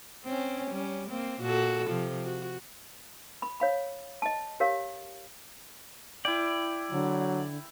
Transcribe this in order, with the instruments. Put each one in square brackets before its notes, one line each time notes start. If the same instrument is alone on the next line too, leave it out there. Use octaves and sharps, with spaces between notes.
[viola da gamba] C4 C#4
G3 C#4
A#3 C4
A#2 F#4 A4
C3 F3
F#4
[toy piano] B5
C#5 F5 B5
D#5 A5
G4 A#4 C#5 F5
[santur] E4 G5 [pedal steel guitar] D5
[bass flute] D3 [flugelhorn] F#3